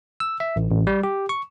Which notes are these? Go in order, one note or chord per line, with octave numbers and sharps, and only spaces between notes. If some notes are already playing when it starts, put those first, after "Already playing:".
E6
E5
A1
A1
G3
G4
C#6